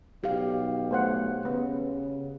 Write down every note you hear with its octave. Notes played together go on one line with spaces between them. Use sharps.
B1 G4 F5
A3 C5 F#5
C#3 B3